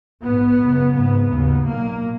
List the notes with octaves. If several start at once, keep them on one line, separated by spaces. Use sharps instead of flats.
A#1 G#2 B3
F#1 F#2 C#3
G#1 G#2 B3
D#2 C#3
B1 A#2 A#3